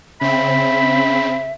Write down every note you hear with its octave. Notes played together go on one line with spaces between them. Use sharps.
C#3 C4 E5 B5